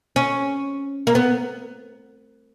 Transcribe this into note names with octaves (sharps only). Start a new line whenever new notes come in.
C#4
A#3
B3